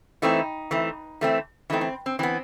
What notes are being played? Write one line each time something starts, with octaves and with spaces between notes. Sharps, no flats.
E3 A3 C4 D#4
E3 A3 C4
E3 A3 C4
E3 A3 C4 D#4
C4
C4
E3 B3 C4